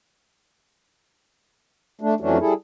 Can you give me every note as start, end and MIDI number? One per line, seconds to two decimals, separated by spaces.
2.01 2.14 57
2.01 2.14 62
2.20 2.38 41
2.20 2.38 52
2.20 2.38 54
2.20 2.38 57
2.20 2.38 61
2.20 2.38 62
2.40 2.53 55
2.40 2.53 64
2.40 2.53 68
2.40 2.53 69